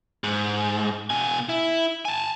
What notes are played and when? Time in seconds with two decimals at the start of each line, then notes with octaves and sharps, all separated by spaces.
0.24 G#2
1.10 B2 G#5
1.49 E4
2.05 G#5 A5